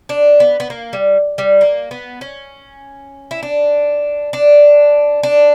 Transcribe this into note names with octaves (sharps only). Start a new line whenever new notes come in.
D4
B3
B3
A#3
G3
G3
A#3
B3
C#4
E4
D4
D4
D4